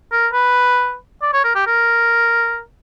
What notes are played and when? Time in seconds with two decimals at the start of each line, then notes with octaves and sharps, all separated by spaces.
0.12 A#4
0.33 B4
1.22 D5
1.33 C#5
1.44 A#4
1.55 G4
1.67 A#4